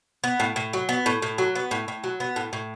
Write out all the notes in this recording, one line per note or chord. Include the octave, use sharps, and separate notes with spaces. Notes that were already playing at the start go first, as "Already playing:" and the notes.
B3
A2
A2
F#3
B3
A2
A2
F#3
B3
A2
A2
F#3
B3
A2
A2